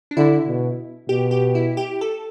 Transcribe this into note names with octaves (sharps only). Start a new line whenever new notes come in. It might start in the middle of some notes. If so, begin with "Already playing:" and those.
D4
D3 E4
B2
B2 G4
G4
E4
G4
A4